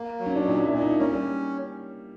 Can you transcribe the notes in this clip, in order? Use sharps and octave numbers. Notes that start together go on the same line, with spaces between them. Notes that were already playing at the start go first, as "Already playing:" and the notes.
Already playing: A#3
F#3
C#4
D4
A#2 D#4
E4
A#2
D#4
A#3 C#4
G3